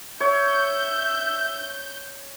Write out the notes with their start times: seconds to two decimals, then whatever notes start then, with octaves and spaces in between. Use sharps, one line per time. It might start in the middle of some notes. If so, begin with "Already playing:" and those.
0.20 C#5 E5 G6